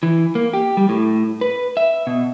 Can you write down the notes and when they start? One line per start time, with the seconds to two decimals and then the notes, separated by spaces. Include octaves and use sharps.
0.03 E3
0.35 A#3
0.53 G4
0.77 G3
0.89 A2
1.41 B4
1.77 E5
2.07 B2